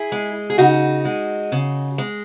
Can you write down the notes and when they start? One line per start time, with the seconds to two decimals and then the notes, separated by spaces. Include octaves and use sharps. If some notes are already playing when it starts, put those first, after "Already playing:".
Already playing: E4 G#4
0.12 G#3
0.50 G#4
0.58 C#3 D#4 F#4
1.05 G#3
1.52 C#3
1.98 G#3